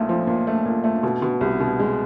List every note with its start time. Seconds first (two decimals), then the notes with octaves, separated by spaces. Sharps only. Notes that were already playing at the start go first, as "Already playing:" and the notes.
Already playing: B1 A#2 A3
0.09 F3
0.27 A#2
0.47 A3
0.65 A#2
0.84 A3
1.03 B2
1.22 B2
1.41 C2
1.60 B2
1.79 G#3